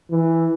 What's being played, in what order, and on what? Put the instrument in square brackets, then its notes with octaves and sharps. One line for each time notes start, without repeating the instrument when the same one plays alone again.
[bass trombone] E3